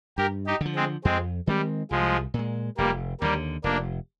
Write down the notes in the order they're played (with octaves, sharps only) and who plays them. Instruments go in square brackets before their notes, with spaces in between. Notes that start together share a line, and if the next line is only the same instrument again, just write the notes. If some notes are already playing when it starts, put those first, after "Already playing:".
[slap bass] G2 [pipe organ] G4 A#4
[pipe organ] D#4 G4
[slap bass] D3 F3
[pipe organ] G#3 C4
[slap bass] F2 [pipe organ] G#3 C4
[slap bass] D#3 G#3 C4 [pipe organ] G3
[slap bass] C2 [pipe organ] F3 G#3
[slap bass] A#2 G#3
[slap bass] F1 [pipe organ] G3 A#3
[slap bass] D#2 D3 [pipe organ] G3 A#3
[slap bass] F1 [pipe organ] A#3 D4